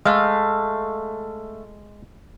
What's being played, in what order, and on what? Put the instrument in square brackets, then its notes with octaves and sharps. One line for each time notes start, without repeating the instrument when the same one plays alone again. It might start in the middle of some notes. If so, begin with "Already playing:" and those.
[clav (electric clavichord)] G#3 [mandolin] A3 F5